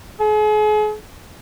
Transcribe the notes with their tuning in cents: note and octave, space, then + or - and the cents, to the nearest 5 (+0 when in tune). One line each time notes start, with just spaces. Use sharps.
G#4 +40